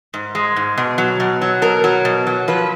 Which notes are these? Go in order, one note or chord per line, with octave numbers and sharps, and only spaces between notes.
G#2
G#3
G#2
B2
F#3
B2
F#3
B2 A#4
F#3
B2
F#3
F3 B4